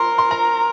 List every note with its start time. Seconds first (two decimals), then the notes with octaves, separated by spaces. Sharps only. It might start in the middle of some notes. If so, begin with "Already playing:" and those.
Already playing: A#4 C6
0.18 C6
0.31 A#5